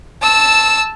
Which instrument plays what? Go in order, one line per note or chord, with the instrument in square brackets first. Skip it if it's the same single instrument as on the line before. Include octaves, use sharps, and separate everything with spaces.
[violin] A5 E6